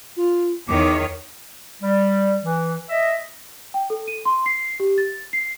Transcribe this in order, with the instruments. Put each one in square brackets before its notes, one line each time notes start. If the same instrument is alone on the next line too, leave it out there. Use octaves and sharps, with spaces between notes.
[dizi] F4
[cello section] E2 D#3 C#5 [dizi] D6
[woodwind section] G3
E3
D#5 E5
[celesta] G5
A4
D#7
C6
C7
G4
A6
C7